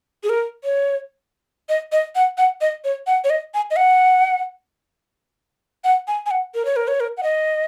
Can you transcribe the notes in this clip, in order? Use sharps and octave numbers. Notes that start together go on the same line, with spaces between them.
G#4
A#4
C#5
D#5
D#5
F#5
F#5
D#5
C#5
F#5
C#5
D#5
G#5
D#5
F#5
F#5
G#5
G#5
F#5
A#4
C#5
A#4
C#5
A#4
F#5
D#5